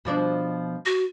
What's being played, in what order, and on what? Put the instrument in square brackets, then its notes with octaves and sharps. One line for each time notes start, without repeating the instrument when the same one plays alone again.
[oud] B2 F3 D4
[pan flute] F#4